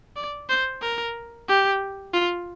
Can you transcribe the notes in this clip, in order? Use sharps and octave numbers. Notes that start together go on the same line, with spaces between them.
D5
C5
A#4
G4
F4